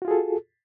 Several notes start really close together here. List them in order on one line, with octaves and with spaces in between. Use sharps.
F#4 F4 G#4 A4